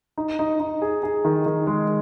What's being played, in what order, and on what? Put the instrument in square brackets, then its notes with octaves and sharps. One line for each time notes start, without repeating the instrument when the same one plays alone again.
[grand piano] D#4
D#4
D#4
G#4
G#4
D#3
D#3
G#3